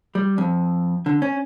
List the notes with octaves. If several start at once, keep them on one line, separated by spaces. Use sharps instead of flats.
G3
F2
D3
C#4